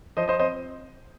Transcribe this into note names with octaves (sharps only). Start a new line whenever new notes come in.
F3 C5 D#5
C5 D#5
C4 C5 D#5